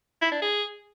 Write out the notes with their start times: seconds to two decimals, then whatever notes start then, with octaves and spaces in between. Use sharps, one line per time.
0.22 E4
0.32 D4
0.42 G#4